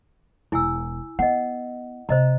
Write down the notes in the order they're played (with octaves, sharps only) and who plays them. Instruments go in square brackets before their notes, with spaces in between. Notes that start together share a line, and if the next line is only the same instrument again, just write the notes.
[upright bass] E1 [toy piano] E4 G#5 E6
[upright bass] B3 [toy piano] D#5 F#5
[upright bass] C3 F3 [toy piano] C5 D#5 A#5